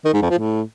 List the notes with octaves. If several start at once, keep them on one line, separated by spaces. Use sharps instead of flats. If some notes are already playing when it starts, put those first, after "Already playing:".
D#3
G#2
F2
F3
A2